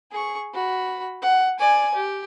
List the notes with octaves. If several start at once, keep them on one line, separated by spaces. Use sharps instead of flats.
G#4 C#6
F#4 B5
F#5
D5 G#5
G4